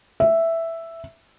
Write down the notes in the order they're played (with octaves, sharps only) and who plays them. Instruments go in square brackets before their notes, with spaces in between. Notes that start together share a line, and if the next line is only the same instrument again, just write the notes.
[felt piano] E5